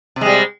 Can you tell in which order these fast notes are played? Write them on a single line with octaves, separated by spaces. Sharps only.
C3 G#3 G3